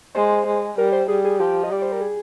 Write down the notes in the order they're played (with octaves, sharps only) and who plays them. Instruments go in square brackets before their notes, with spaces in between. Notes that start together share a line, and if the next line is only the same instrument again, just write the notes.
[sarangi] G#3 [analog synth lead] C5
[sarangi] G#3
[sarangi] G3 [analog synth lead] A#4
[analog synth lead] C5
[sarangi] G3 [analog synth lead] G#4
[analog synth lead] G#4
[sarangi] F3 [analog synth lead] G4
[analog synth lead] D#5
[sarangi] G3 [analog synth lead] D5
[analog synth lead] C5
A#4
G#4